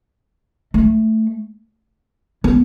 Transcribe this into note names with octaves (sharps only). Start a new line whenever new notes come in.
A3
B3